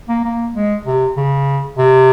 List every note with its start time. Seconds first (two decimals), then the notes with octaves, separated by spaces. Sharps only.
0.09 A#3
0.25 A#3
0.55 G#3
0.86 C3
1.17 C#3
1.78 C3